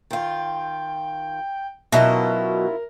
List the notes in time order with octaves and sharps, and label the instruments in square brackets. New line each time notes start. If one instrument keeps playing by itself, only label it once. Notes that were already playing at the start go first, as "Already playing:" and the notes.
[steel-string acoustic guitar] D#3 F4 [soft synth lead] G5
[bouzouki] B2 F#3 D#5 [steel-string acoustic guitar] C#4 E4 F4 [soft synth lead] A#4 [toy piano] E5